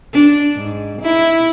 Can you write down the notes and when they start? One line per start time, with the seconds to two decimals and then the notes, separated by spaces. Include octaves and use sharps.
0.13 D4
0.55 G#2
1.01 E4